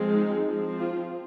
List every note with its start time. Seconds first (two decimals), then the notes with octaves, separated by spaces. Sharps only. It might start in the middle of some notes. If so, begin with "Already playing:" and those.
Already playing: F3 G#3 C4
0.11 D#4
0.45 F3 C4
0.79 F4